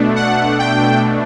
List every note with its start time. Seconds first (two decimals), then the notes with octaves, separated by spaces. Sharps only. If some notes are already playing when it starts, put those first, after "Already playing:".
Already playing: B2 A3 D4
0.16 F#5
0.59 G5